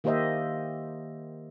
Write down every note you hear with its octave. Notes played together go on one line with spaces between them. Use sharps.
D#3 A#3 G4 C5 D#5 E5